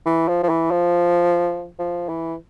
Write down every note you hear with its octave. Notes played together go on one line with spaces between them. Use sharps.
E3
F3
F3
E3
F3
F3
E3